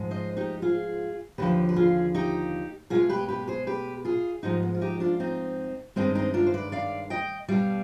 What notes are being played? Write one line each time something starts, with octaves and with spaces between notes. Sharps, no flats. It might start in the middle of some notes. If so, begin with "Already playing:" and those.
Already playing: G#2 F3 G#3
C5 D#5
D#4 G4
F4 G#4
D#2 D3 F3 G4 B4
B4
F4 G#4
D#4 G4
B2 G#3 F4 G#4
G4 B4
G4 B4
G#4 C5
G4 B4
F4 G#4
G#2 F3 G#3 D#4 G4
B3
F4
D#4 G4
D4 F4
C4 D#4
G2 D#3 G#3 C4 D#4
C4 D#4
D4 F4
C5
B4 D5
D5 F5
D#5 G5
B2 G3 D5 F5